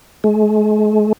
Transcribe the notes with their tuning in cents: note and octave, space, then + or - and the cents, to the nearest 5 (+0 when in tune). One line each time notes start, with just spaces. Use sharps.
G#3 +40